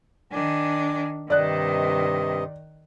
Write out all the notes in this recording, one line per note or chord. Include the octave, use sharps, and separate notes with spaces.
D#3 D4 G#5
G2 C3 D#3 D5 D#5 F#6